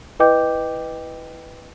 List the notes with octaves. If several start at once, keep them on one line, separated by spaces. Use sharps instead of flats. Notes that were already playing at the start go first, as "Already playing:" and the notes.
E4 B4 D#5 G5 D6 G6